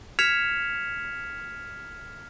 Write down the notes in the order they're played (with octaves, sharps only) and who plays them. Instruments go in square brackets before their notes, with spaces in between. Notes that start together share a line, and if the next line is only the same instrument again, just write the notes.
[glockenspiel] F6 G#6 B6 C#7 E7 F7